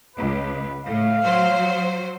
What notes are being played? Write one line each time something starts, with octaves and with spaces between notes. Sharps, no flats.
C#2 B4
A2 F5
F#3 C5